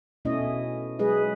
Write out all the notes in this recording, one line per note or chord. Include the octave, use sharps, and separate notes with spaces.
B2 A3 C#4 E4 C#5 D#5
F#3 G#3 G#4 B4 D#5